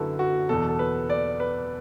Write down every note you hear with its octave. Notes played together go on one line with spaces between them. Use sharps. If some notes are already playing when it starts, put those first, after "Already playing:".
Already playing: F#2 D3 E4 F#4 A4 B4
F#4
E2 B2 A4
A4
B4
D5
B4